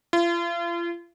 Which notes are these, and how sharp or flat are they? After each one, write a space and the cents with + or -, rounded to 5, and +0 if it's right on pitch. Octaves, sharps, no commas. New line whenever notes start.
F4 -40